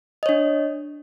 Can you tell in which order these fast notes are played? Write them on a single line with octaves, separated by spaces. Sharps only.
D#5 C#5 D4